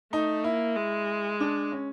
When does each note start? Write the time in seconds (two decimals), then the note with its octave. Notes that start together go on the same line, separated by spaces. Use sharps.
0.13 A3 D#4
0.44 A#3 E4
0.76 G#3
1.40 D4
1.72 C#4